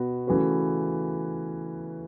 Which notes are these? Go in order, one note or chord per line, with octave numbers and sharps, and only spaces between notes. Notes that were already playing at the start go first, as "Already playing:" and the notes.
Already playing: B2 B3 F#4
C#3 E3 A3 F#4 B4